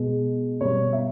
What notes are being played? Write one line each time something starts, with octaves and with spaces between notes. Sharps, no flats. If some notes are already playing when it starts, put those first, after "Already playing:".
Already playing: B2 G#3
B2 G3 C#5
E5